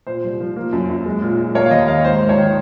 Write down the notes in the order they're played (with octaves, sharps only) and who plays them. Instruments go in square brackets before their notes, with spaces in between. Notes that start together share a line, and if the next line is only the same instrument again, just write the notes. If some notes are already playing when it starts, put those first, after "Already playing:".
[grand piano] A#2 C5
C2
F3
A#3
F#2
F#2
G#3
A#2
A#2
A#3 C#5
F5
D#2 D#5
D#3 F5
G#2 C5
G#2
C#5
D#3